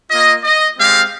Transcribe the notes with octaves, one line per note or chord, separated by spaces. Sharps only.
A#3 F4 D#5
D#5
G#3 C4 G4 F5